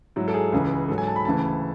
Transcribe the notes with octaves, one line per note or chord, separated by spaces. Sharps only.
G#2 F#3 E4
A4
G#4
C#2 C#3 E3
G#2 F#3 A4
G#5
A5
B5
D2 C#3 E3 A5